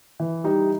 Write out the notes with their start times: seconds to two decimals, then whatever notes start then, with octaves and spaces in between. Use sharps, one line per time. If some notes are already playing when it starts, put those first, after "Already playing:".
0.20 E3
0.44 G3 D#4 G4